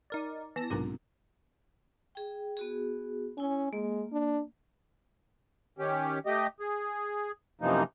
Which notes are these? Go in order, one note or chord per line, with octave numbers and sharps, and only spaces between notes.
D#4 A#4 D5
E3 B3 A5 A#6
B1 G#2 C3 D4 F4 A#4
G#4 G5
B3 F#4 G#4
C#4 E4 G#5
G#3 A#3
D4
D#3 C#4 G4
A3 G4 D#5
G#4
F#2 C3 E3 F3 A#3 D#4